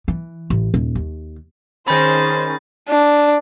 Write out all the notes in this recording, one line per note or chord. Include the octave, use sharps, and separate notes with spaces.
E3
A1
D#1
D#2
D#3 C#4 G#4 C5 B5 G6 A6 A#6
D4